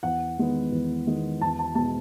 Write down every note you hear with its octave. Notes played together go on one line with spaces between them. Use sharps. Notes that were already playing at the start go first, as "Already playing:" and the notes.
E2 F#5
D#3 G#3 B3
E2
D#3 G#3 B3
E2 A5
A5
B2 G#3 A5